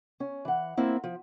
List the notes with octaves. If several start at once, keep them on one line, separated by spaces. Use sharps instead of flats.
C#4
E3 F#5
A#3 C4 E4
F3